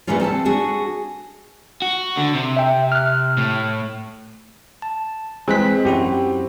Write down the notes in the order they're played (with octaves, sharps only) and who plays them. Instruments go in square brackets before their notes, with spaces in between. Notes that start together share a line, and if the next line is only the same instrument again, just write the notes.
[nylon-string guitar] E3 G3 A3 A#3 C#4 F4
C4 A4 G#5 A5
D4 F#4 G#4 A4
[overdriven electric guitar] F#4
D3
C3
[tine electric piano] E5 G5
F6 F#6
[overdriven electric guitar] A2
[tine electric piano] A5
[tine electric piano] E3 F#6 B6 [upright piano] G#3 [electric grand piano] C4
[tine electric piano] F#2 E4 F#4 [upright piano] G4